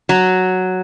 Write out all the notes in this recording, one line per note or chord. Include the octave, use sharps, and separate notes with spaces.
F#3